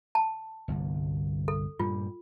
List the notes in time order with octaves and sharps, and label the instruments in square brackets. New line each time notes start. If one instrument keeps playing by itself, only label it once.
[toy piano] A5
[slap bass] G1 C2
[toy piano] A4
[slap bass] G2 A#2 G3 [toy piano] F4